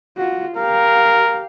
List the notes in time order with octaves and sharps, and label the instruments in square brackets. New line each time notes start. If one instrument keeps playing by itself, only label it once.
[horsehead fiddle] F4 F#4
[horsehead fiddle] G4 F5 [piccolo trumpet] A#4